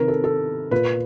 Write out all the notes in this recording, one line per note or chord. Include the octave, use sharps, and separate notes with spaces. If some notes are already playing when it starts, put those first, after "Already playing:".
Already playing: C3 D#3 A#4 B4
A4
A4
A#2 B4